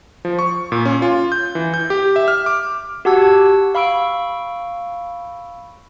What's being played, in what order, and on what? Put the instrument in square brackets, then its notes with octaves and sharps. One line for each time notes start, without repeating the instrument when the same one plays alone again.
[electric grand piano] F3
C#6
A#2
C#4
F4
G6
E3
G6
G4
E5
F6
D6
[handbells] F#4 G4 F#5 A5 E6 G#6
F5 B5 C#6 E6 D7